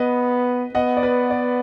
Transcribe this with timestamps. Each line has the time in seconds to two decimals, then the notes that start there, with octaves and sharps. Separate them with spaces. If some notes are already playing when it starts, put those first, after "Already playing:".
Already playing: B3 B4 D#5
0.75 B3 D#5 F#5
0.97 D5
1.03 B4
1.30 D5